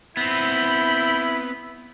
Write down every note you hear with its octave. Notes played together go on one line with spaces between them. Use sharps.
B3 C4 E4 B5 G6